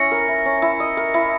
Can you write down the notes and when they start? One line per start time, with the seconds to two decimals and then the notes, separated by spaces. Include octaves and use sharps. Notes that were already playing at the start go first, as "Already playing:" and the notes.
Already playing: C#4 E4 A#6 C#7
0.11 A#4
0.28 E4
0.45 C#4
0.62 E4
0.80 D#5
0.97 A#4
1.14 E4